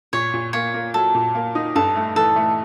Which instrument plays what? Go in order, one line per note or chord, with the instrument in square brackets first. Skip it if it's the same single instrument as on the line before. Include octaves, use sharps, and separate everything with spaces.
[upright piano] A#2 [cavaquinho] C#5
[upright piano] A#2
[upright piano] A#3 [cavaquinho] C#5
[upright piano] A#3
[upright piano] F#3 [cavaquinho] A4
[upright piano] A#2
A#3
D#4
[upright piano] G2 [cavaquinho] A4
[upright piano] A3
[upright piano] E3 [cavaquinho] A4
[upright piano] A3